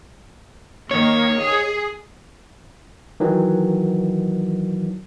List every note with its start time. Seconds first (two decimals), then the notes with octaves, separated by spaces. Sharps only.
0.91 D#3 A#3 C#5
1.43 G#4
3.20 D#3 E3 F#3